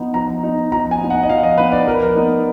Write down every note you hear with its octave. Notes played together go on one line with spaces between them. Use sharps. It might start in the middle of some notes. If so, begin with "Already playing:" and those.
Already playing: F3 B3 D#4
F3 A#5
B3 D#4
F3 A#5
G#5
B3 D#4
F#5
D#5
F3 F5
D#5
B3 D#4 B4
D5
F3 A#4
B4
A#4
B3 D#4